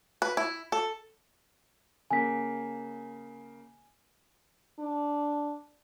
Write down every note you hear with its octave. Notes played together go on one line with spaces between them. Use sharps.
B4
E4
A4
C#3 A#3 G#5 B6
D4